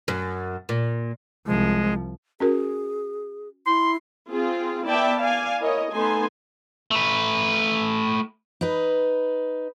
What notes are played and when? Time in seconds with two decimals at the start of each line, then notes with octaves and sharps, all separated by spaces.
0.08 F#2
0.69 A#2
1.46 C2 F3 G#3
2.40 C#4 F#4 G#4 A#4
3.67 E4 C6
4.31 C4 F4 G#4
4.88 B3 E4 D5 E5 G5 A5
5.21 D5 F5 G#5
5.61 E4 A#4 C#5 D#5
5.93 A3 B3 D#4 A4 G#5 C6
6.91 A3 B4
8.61 D#4 B4